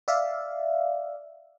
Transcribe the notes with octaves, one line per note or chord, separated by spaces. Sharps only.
D5 E5 F5